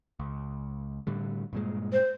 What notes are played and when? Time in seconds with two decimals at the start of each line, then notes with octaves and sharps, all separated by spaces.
0.20 C#2
1.07 A2 D3 G3
1.53 G2 A#2 G#3
1.93 C5